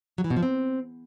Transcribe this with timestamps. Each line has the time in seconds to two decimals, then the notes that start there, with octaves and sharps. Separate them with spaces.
0.18 F#3
0.24 E3
0.30 B2
0.37 F3
0.43 C4